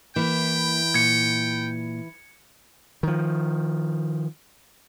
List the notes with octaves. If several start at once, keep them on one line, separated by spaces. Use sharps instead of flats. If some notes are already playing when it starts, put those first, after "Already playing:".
E3 A#3 E4 G5
A#2 G#6 C#7
D#3 F3